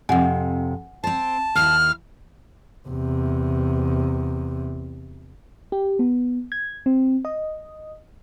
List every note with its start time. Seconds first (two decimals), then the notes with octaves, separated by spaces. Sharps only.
0.09 F2 C3 F#5 G#5
1.04 C4 C5 A5
1.55 D#2 E4 F6
2.88 E2 C3
5.72 G4
5.99 B3
6.52 G#6
6.86 C4
7.25 D#5